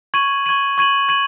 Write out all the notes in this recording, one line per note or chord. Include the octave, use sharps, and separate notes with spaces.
C#6 G#6 D#7 F#7
C#6 G#6 D#7 F#7
C#6 G#6 D#7 F#7
C#6 G#6 D#7 F#7